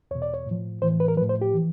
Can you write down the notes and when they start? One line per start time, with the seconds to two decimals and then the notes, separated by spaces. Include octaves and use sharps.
0.11 E2 B2 C#5
0.22 D5
0.34 C#5
0.46 A2 F3
0.82 A2 E3 C5
1.00 B4
1.08 A#4
1.17 F3 B4
1.22 A2
1.29 C5
1.41 G4
1.54 E3